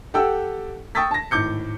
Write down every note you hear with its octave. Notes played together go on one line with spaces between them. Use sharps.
G4 A4 F#5 G5 E6
G5 C#6 D#6 E6 A6 B6
A5 A#6
G#1 A2 D6 G6 C#7